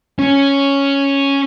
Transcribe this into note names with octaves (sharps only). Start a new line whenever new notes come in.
C#4